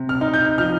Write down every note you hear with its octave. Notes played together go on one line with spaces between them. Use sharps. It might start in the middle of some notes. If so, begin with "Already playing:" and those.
Already playing: C3
F6
D#4
G6
F3 F6